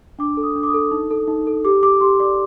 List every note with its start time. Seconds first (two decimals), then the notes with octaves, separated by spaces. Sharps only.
0.19 D4 D6
0.37 A4
0.43 D#6
0.55 D4
0.63 D6
0.67 D#6
0.74 A4
0.91 D#4
1.11 A4
1.28 D#4
1.47 A4
1.65 G4 D6
1.82 G4 D6
2.00 G4 C6
2.20 D5 D6